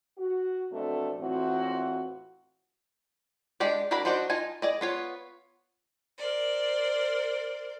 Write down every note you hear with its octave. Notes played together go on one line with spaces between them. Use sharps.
F#4
F2 B2 F#3 A3 C4 D4
E2 A2 E3 C4 F4 F#4
G#3 D4 G4 D5
D4 F#4 A#4 D5 B5
D4 D#4 F#4 C5 D5
D#4 F4 G#5 A5
G#4 D5 D#5
B3 F4 C#5
A#4 C5 D5